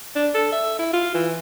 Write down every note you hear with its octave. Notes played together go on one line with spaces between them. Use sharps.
D4
A4
E5
E4
F4
E3